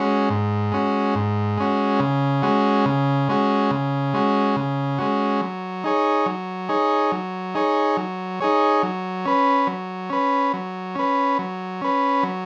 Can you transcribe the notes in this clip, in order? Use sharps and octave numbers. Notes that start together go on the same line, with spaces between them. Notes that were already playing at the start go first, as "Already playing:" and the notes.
Already playing: G#3 C#4 F#4
G#2
G#3 C#4 F#4
G#2
G#3 C#4 F#4
C#3
G#3 C#4 F#4
C#3
G#3 C#4 F#4
C#3
G#3 C#4 F#4
C#3
G#3 C#4 F#4
F#3
D#4 G#4 C#5
F#3
D#4 G#4 C#5
F#3
D#4 G#4 C#5
F#3
D#4 G#4 C#5
F#3
C#4 B4
F#3
C#4 B4
F#3
C#4 B4
F#3
C#4 B4
F#3